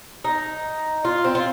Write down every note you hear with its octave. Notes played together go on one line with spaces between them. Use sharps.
D#4
F4
C4
F4